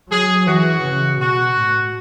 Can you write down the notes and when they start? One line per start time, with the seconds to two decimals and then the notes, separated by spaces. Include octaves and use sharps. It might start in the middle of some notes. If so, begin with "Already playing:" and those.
0.10 F#3 G#4
0.47 E3 F#4
0.83 C#3
1.20 B2 F#4
1.59 A2